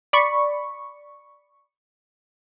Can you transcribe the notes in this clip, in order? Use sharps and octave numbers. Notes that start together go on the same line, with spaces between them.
D5 B5 C#6